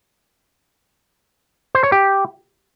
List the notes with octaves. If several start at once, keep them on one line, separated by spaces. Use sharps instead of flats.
C5
C#5
G4